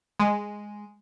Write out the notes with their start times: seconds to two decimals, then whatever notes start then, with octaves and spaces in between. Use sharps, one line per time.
0.20 G#3